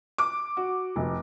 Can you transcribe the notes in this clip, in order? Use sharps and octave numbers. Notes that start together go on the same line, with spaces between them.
D6
F#4
F1